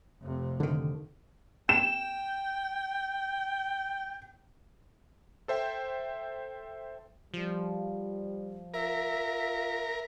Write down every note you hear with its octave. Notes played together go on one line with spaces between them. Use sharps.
F1 C3
D3 D#3
G5 E7
A4 C5 E5 G5
F3 G3
F4 A#4 E5